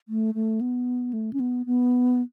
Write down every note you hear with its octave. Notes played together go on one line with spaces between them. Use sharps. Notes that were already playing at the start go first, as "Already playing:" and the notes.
A3
A3
B3
A3
C#4
B3
B3